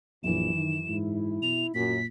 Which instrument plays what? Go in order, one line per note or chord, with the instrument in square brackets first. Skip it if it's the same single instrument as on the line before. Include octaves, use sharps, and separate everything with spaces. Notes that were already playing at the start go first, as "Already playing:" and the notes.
[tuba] A#1 [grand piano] F#2 E3 [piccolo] E7
[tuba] D#3
[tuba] G#2 [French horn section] E4
[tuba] B2 [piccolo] F7
[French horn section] F#2 [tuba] A#2 [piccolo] B6